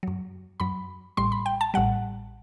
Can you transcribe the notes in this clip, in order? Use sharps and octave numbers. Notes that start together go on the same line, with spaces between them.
F#2 F#3
F#2 F#3 B5
A1 A2 G3 C6
B5
G5
A5
A1 A2 G3 F#5